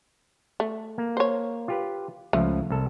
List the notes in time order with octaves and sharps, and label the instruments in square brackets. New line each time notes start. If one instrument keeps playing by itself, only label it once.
[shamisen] A3
[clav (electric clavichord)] A#3
[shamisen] C5 C#5
[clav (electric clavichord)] F4 G4 B4
[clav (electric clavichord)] C#2 F3 [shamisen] A3
[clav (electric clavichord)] C2 A4